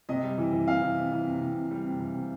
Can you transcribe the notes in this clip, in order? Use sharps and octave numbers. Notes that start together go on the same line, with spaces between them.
C3 D#5
G3
E3
E3
C3 F5
E3
C3
E3
C3
C3
C3
G3
C3
E3
C3